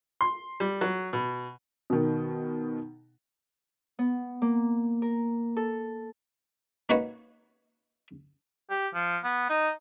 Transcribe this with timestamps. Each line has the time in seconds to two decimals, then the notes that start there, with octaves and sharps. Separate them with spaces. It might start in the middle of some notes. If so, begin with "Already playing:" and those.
0.21 C6
0.60 G3
0.81 F#3
1.13 B2
1.90 B2 D#3
3.99 B3
4.42 A#3
5.02 A#4
5.57 A4
6.89 A#3 D#4 F#4 B4 C#5 D#5
8.70 G4
8.94 F3
9.24 B3
9.50 D#4